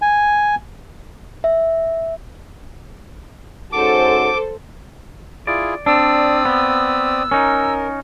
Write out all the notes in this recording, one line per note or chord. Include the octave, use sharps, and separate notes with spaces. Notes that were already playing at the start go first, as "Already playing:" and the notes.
G#5
E5
G#2 C#4 F#4 A4 C5 D6
E4 F4 G#4 D5
C4 D4 D5 D#6 E6
B3
C#4 D#4 A#4